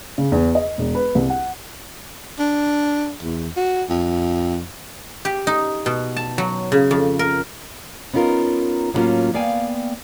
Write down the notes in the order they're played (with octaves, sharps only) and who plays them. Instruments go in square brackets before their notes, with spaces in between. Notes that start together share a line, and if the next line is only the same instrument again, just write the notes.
[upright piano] C#3
E2
D#5
E1
B4
C2
F#5
[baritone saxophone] D4
E2
F#4
F2
[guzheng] G4
D#4
B2
A5
F#3
C#3
F2
A#4
[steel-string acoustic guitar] B3 C#4 D#4 F4 A#4
A2 F#3 G3 A#3 C#4 F4
A#3 B3 D5 F5 G5 G#5